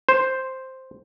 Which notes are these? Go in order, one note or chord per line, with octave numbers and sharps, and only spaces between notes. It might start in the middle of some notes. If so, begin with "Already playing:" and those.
C5